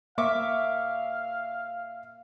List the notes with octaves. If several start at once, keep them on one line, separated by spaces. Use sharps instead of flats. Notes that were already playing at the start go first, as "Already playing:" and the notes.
A#3 E5 F5 C#6 D6